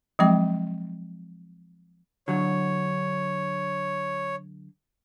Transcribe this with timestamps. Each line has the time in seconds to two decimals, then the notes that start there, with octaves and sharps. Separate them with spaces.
0.19 F3 F#3 G#3 C4 G5 D6
2.28 D3 F#3 C#5